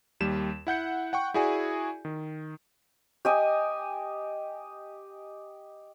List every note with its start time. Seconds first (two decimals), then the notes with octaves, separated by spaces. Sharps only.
0.20 D#2 G3 E7
0.67 E4 F#5 G6 C#7
1.13 F#5 G5 C#6
1.34 E4 F#4 G#4 D5 G#5
2.05 D#3
3.25 G4 D#5 G#5